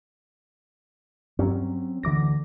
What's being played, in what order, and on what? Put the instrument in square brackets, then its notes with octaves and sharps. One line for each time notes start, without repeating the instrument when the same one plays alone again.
[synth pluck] G2 [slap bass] F#3 C4 C#4
[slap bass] D2 D3 [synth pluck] E3 D6 A#6